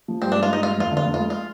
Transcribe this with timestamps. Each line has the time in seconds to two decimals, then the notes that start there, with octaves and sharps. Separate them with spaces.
0.08 F3
0.22 G2 C4
0.32 G#3 D4
0.43 F4
0.50 G2 D#4
0.63 G#3 F4
0.78 F2 F4
0.91 D3
0.97 F4
1.05 F2
1.14 F4
1.19 G#3
1.30 F4